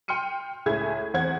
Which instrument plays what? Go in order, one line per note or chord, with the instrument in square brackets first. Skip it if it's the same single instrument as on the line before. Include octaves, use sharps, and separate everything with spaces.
[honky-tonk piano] G5 C6 F6 C#7 D#7
C#2 A2 G#4 E5 G#6
E2 C4 C5 F#5 G#6